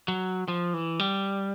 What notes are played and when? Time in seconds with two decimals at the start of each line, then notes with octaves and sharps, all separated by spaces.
0.08 F#3
0.48 F3
0.74 E3
0.99 G3